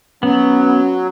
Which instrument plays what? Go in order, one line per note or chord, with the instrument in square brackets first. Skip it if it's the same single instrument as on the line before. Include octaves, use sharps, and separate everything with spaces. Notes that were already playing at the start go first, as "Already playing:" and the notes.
[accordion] F#3 [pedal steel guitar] B3 [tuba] C#4